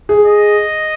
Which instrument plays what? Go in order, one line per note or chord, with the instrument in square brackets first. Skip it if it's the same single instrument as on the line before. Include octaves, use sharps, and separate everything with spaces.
[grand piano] G#4
[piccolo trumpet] D#5